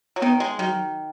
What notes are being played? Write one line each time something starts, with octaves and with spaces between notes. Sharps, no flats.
F#3
D#3 B3
G#3
D#3 F#3